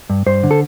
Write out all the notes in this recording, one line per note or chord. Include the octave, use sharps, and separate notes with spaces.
G2
G2 C5
D3
A4